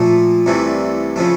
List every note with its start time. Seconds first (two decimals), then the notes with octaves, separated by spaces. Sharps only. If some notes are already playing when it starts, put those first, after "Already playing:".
Already playing: A#2 F3 A3
0.46 C2 C3 E3 A3
1.16 C#3 F3 A3